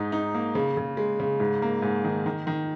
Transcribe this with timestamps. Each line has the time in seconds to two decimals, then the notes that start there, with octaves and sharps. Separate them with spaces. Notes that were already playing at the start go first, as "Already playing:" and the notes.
Already playing: G#2 D#4
0.12 D#4
0.34 A#3
0.55 C#3
0.77 C#3
0.97 G#3
1.20 C#3
1.40 G#2
1.62 A#3
1.82 G#2
2.04 D#3
2.26 D#3
2.47 D#3